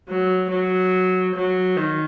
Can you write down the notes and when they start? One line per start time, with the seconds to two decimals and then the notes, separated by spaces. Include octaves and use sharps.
0.09 F#3
0.51 F#3
1.35 F#3
1.77 D#3